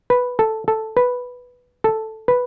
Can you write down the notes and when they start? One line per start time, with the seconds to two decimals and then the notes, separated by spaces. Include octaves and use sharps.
0.10 B4
0.39 A4
0.68 A4
0.97 B4
1.84 A4
2.28 B4